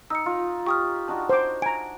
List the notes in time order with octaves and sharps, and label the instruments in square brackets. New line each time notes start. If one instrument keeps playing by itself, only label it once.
[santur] D#4 [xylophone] E6 C#7
[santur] F4
[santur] G4 [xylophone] C#6 D#6 F6
[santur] D4 D#4 F#4
[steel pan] C5 D6
[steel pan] G#5 A#5 [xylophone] D7